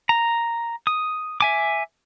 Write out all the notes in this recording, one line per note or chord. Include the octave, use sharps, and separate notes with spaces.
A#5
D#6
E5 G#5 D6